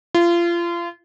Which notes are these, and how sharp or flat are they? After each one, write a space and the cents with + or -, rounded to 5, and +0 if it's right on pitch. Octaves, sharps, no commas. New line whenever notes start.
F4 -30